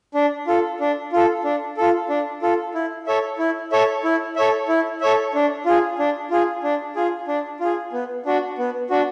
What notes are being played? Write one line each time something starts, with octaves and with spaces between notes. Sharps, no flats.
D4
F4 A4
D4
F4 A4
D4
F4 A4
D4
F4 A4
E4
A4 C#5 E5
E4
A4 C#5 E5
E4
A4 C#5 E5
E4
A4 C#5 E5
D4
F4 G#4
D4
F4 G#4
D4
F4 G#4
D4
F4 G#4
B3
D4 F#4
B3
D4 F#4